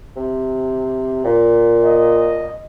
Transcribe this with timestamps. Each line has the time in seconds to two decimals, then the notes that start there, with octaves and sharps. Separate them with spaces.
0.16 C3
1.25 A#2
1.84 D#5